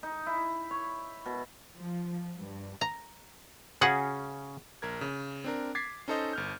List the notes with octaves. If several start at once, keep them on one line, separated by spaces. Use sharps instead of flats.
D#4
E4
C#5
B2
F3
G2
A#5
C#3 C#4 F#4 G#4 F#5
A#1 A#4 G#6
C#3
C4 D4 A#4
D6 G#6 A6 B6 C7
C#4 D#4 A4 C5 D#5
G1 F6 G6